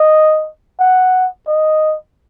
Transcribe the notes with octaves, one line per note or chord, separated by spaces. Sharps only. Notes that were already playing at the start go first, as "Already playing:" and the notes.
Already playing: D#5
F#5
D#5